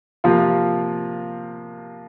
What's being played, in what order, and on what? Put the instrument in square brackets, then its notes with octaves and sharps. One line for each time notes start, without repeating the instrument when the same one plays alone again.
[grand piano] C3 F3 A#3 F4